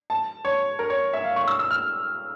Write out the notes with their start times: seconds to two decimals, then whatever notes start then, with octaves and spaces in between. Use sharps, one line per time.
0.10 A5
0.45 C#5
0.79 A#4
0.90 C#5
1.13 E5
1.24 F5
1.36 C#6
1.48 E6
1.59 E6
1.71 F6